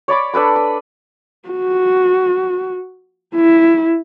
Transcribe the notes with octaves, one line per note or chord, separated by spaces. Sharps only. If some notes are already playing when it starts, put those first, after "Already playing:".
C#5 D5 B5 D6
D4 A4 B4 B5
B5
F#4
E4